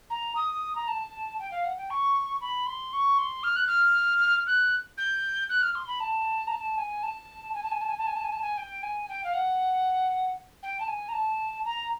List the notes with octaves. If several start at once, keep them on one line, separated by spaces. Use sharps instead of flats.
A#5
D#6
A#5
A5
G5
F5
F#5
G5
C#6
B5
C6
C#6
C6
F6
F#6
F6
F#6
G6
F#6
F6
C6
B5
A5
A#5
A5
G#5
A5
G#5
A5
G#5
A5
G#5
A5
G#5
A5
G#5
A5
G#5
G5
G#5
G5
F5
F#5
G5
A5
G#5
A#5
A5
A#5